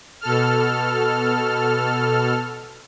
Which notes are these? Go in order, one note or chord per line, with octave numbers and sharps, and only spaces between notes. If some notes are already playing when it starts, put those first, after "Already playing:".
B2 A4 F6